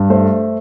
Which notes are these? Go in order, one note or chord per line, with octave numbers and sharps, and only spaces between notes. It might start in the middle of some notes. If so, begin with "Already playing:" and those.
Already playing: G2
A3 C5